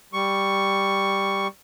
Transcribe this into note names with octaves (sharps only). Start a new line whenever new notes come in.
G3 C#6